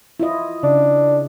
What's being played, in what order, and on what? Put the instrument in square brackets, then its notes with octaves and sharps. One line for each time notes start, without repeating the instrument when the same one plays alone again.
[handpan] E4 F4 D#5
[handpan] C#3 [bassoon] D4